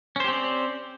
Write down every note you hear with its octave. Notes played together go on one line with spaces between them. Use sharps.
C4 C#4 G4 C5 D5